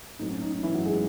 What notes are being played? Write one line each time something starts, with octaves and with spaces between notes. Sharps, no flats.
A2 F#3 C4 D#4
C#4
D#4
D#4
E3 E4
F#3 F#4
G#3 G#4